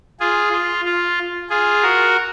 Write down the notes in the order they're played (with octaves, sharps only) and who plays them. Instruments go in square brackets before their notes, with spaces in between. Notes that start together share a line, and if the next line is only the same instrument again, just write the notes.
[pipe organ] F4 G#4
F4
F4
F4 G#4
F#4 A#4